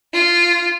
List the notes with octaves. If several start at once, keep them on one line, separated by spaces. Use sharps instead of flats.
F4